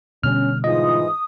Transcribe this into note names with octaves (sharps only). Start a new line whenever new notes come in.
B2 D3 G3 C#4 F6
G#2 E3 F4 D#5 D#6